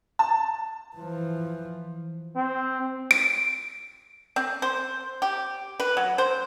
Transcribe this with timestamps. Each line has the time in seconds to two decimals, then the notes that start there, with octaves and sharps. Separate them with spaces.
0.19 A5
0.96 E3 F3
2.36 C4
3.11 D7
4.36 C4
4.62 C5
5.22 G4
5.80 B4
5.97 F#3
6.18 C5